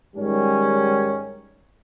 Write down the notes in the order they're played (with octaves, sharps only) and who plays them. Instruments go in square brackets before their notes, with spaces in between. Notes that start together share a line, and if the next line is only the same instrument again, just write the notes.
[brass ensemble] G#2 D#3 G3 C#4